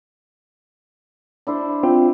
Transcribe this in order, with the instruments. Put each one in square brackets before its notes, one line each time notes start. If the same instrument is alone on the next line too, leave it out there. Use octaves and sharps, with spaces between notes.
[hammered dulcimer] D4 E4 C5
[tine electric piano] C4 F4